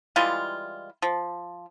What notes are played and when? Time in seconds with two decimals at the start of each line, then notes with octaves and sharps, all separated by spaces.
0.16 E3 G3 G#3 F4
1.02 F3